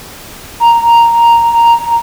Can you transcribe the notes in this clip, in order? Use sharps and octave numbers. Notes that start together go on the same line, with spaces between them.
A#5